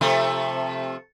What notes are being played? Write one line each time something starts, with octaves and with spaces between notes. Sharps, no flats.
C3 F3 A3